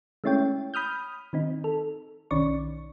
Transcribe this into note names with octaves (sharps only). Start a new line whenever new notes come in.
G#3 A3 C#4 E4 C#5 G5
B5 D#6 F6 G6
D#3 C4 D#4
A4
B1 D#3 C#4 D5 C#6